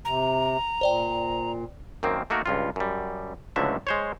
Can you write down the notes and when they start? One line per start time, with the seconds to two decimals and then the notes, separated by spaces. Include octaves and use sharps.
0.05 C3 A#5
0.81 A#2 C5 D5 G5
2.03 F#2 D#3 A#3 C4
2.30 A3 A#3 D#4 F#4 A#4
2.46 C#2 G2 F4
2.76 F#2 G3
3.56 C#2 A2 D3 F3 F#3 E5
3.87 G#3 C5 C#5